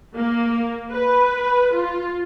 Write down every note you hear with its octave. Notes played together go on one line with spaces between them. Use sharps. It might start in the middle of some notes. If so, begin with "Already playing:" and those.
A#3
B4
F4